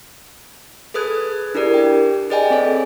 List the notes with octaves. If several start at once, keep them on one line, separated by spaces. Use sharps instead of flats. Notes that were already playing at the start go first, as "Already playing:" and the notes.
G#4 A4 B4 D#6 F#6 G#6
D4 E4 G4 A#4 D5
G4 G5
G#4 B4 D5 D#5 G5 G#5
C4 A4 C#5